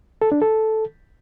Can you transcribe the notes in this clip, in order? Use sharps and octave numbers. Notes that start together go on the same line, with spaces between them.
A4
D4
A4